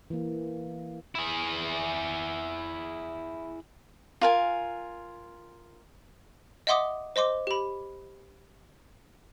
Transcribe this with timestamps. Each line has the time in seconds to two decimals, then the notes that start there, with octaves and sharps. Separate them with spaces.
0.10 E3 A#3
1.15 E4 G#4
4.21 F4 A#4 G#5
6.67 D#5 E5 F#5 C6 D6 D#6
7.16 C5 D#5 C6 D6
7.47 G4 B5